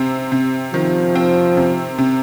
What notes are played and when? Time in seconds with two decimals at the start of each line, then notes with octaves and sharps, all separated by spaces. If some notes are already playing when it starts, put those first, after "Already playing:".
Already playing: C3 C4
0.32 C3
0.74 D#3 F3
1.15 C4
1.57 C3
1.98 C3